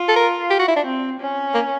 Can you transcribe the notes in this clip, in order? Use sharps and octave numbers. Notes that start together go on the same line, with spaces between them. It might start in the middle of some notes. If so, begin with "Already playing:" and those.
Already playing: F4
A4
A#4
G4
F#4
E4
D4
C4
C#4
A#3